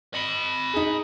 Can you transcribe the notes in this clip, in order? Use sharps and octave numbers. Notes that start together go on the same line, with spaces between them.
D#5 B5
D#4 G#4